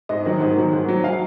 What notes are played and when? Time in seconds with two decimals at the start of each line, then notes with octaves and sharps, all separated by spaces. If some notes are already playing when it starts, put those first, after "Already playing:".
0.09 G#2 D#5
0.25 D#3 F#3
0.41 G#2
0.57 D#3 F#3
0.73 G#2
0.88 F#3
1.04 F5